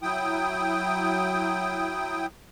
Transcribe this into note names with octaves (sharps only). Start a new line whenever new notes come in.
F#3 E4 G5 D#6